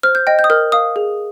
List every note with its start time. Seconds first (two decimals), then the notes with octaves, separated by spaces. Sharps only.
0.03 C5 F6
0.15 G6
0.27 D#5 G5
0.39 G6
0.44 D#6
0.50 A#4 F6
0.72 F5 D#6
0.96 G#4